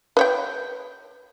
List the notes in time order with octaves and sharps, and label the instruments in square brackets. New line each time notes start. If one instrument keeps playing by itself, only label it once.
[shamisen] B4 C#5 G5